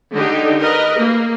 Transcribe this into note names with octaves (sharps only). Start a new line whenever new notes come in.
D3 D#4 G4
A#4 B4 D#5
A#3